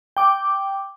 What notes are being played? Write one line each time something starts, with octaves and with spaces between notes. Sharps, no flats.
G5 D6